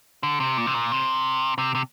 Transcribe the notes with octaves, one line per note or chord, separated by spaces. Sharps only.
D3
C3
A#2
C3
A#2
C3
C3
C3